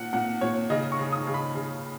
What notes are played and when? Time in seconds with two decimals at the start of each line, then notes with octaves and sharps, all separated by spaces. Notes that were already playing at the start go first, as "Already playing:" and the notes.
Already playing: A#2 F#5
0.13 A#2 F#5
0.41 A#2 C#5
0.70 C#3 D#5
0.92 C#6
0.99 C#3
1.12 D#6
1.27 C#3
1.34 B5
1.55 C#3